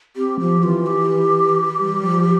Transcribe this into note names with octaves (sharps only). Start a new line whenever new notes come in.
C4 G4
F3 G4
E3 F4
G4
G3
F3